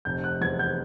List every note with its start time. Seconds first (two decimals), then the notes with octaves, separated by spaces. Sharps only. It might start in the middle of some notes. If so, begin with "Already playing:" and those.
0.05 F1 G6
0.24 F#6
0.41 E2 G#6
0.59 G6